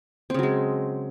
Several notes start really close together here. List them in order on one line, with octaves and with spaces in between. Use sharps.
C4 C#3 F#3 G#3